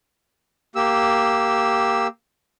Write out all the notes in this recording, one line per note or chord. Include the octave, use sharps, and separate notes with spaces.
A#3 G4 E6